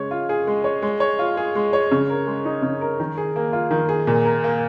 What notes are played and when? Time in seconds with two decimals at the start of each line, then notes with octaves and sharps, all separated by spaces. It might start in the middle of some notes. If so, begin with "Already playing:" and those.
Already playing: C#3 G#3 C#5
0.11 F4
0.29 G#4
0.47 G#3
0.64 C#5
0.82 G#3
1.00 C#5
1.19 F4
1.37 G#4
1.55 G#3
1.73 C#5
1.92 C#3
2.10 A#4
2.27 G#3
2.45 D#4
2.62 C#3
2.81 A#4
3.00 D#3
3.18 G#4
3.36 A#3
3.53 F4
3.71 D#3
3.89 G#4
4.07 A#2
4.25 A#4
4.44 A#3